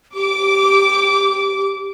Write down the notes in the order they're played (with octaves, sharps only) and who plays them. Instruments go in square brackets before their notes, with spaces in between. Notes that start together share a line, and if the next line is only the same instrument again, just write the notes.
[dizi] G4 [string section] D6